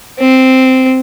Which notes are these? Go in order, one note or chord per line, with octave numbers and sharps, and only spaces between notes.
C4